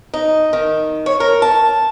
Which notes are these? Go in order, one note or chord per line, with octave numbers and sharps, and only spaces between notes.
D#4
D#3
C#5
A#4
A5